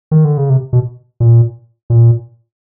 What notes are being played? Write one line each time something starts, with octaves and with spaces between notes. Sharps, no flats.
D#3
D3
C#3
C3
B2
A#2
A#2